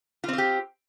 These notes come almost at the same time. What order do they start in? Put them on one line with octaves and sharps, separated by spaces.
F4 C4 C5 G4